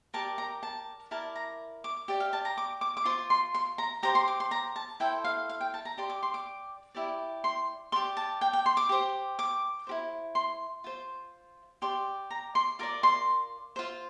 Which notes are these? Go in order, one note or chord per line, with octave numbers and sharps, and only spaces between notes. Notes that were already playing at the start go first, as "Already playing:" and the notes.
G4 A#4 D5 A5
A#5
A5
E4 A#4 D5 A5
A#5
D6
G4 D5
F5
A5
A#5
D6
D6
D6
F4 C5 C6
C6
C6
A#5
G4 C5 A#5
C6
D6
C6
A#5
A5
E4 A4 C5 G5
F5
F5
G5
A5
A#5
G4 D5 C6
D6
C6
D6
E4 G4 D5
C6
G4 D5 C6
A5
G5
G5
C6
D6
G4 C5
D6
E4 G4 C5
C6
F4 C5
G4 D5 C6
A#5
C6
F4 A#4 D5 D6
C6
F4 C5